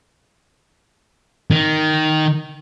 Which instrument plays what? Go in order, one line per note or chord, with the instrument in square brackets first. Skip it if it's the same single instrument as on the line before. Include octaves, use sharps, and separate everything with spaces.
[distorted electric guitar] D#3